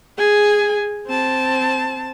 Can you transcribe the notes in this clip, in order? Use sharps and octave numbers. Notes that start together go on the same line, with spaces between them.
G#4 G#5
C4 A5